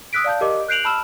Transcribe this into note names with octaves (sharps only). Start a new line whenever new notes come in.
D#6 E6 F#6 B6 D7
D5 F5 A5 G6
G4 A#4 D#5 D6
F#6 G6 C7 D7 F7 F#7
A5 B5 E6 F6 E7